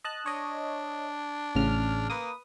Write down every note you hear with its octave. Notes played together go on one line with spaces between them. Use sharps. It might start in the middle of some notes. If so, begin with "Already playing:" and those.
D#5 A5 F#6
D4 C#5 D#5
A1 C#3 F6
A#3 B4 D#6